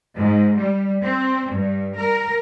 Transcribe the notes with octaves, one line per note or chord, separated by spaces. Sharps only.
G#2
G3
C4
G2
A#4